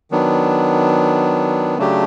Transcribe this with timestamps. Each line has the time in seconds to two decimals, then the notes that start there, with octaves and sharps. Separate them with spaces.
0.11 D#3 F#3 B3 D4
1.78 C#3 F#3 A3 D4 G4